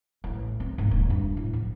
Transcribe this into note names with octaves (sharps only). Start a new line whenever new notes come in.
A1
C4
G#2
D#1
G2
A2
F3